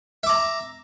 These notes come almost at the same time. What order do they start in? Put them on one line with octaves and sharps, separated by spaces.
E5 D6 A#5